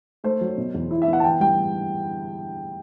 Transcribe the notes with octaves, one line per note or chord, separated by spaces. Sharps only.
A3 C5
F#3
B2
E2
E4
E5
B3
F#5
A5
E3 G5
G3 G5